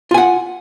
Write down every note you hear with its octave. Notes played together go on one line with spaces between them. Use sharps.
F4 F#5 G#5